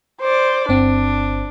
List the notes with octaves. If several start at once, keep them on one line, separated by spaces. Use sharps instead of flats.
C5 D5
G1 C4 D4